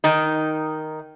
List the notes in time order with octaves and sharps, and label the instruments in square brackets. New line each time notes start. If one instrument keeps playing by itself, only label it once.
[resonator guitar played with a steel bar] D#3 D#4